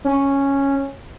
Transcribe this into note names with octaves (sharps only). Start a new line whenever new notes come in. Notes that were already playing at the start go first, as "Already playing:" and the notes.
C#4